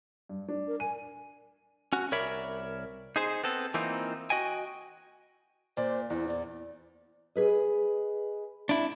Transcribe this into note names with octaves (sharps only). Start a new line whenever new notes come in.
G2
D4
A#4
G#5 D#7
C#4 F#4
C2 A#4 C#5 D5 E5 B5
D#4 G#4 C5
B3 C4 A4
E3 A#3 C4 D#4 F4
F#4 D#5 G5 G#5
A#2 C5 D5
E2 E4
D5
G#4 B4 D#5
D4 E4